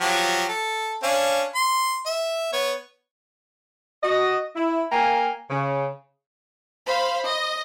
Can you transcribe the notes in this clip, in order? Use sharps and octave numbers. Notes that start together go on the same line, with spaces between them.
F3 F#3 G4
A4
C#4 D4 F5
C6
E5
B3 C#5
F#4 D#5
E4
A#3 A#4 F5 G5 G#5 A#5
C#3
C5 F5 B5
D#5